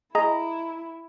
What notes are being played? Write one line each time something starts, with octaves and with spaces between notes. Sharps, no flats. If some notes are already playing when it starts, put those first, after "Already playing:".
E4 G#4 D#5 A#5